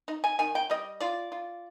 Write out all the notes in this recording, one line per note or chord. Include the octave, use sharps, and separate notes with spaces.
D#4
G#5
D#3 G#5
G5
G3 D#5
F4 D5
F4